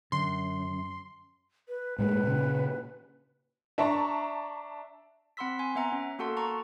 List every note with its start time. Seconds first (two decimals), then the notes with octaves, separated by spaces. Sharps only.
0.12 F#2 D3 C6
1.68 B4
1.98 A2 G#3 A#3 B4
2.23 A#2 C#3
3.78 D4 E5 A5 A#5 C#6
5.37 C4 F#5 B5 C6 E6 B6
5.59 G#5 C6
5.75 B3 E5 F#5 A#5
5.92 C#4
6.19 A#3 F#4 A4 F#5 A5 C6
6.37 A5 A#5 C#6